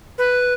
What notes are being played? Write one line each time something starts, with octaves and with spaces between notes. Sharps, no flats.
B4